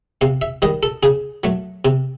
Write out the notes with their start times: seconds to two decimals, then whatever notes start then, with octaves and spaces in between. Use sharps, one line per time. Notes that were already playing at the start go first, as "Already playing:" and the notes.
0.21 C3 F5
0.42 E5
0.62 D#3 G3 D#5
0.83 A4
1.03 C#3 G#4
1.44 F#3 A3
1.85 C3